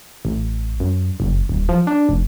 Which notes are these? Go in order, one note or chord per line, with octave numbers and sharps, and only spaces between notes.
A1
F#2
F#1
D#1
F3
D4
F1